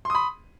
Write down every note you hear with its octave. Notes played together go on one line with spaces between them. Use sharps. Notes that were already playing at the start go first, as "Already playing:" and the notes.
B5 C6 D#6